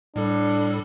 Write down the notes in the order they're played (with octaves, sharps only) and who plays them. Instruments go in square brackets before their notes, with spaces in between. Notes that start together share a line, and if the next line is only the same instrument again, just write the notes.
[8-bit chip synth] A2 G3 A4 [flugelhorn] D4